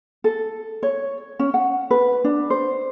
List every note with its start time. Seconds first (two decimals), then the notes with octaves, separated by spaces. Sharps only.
0.24 A4
0.83 C#5
1.39 C#4
1.54 F#5
1.91 B4
2.24 D4
2.50 C5